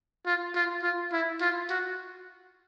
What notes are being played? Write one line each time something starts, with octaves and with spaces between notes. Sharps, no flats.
F4
F4
F4
E4
F4
F#4